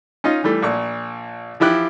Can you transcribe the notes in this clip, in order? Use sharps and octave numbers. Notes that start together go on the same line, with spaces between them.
C#4 D#4 F4 D#5
E3 G3 A3
A#1 A#2 C#6
E3 F3 E4 G4 F#6